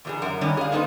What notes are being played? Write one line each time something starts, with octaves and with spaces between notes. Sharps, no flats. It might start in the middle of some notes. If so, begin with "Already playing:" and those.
E2 B2 G#4
F#2 A#4 F#5
D#3 G3 B3 C#4
G#4 F5
A#3 B3 D#4 A4 B4 C5